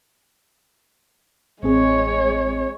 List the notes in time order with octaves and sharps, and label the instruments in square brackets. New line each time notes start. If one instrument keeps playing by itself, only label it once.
[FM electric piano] A1 C4 G#4 [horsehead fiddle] G#3 C#5